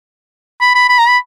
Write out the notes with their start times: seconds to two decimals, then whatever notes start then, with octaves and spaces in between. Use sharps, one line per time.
0.61 B5
0.75 B5
0.89 B5
0.99 A#5
1.08 B5